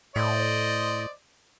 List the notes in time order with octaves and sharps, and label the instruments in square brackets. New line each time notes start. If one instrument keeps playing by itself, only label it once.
[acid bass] A2 [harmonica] C5 D5 D#5